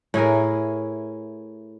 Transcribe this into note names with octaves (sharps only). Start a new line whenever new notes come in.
A2 E4 G#4 A#4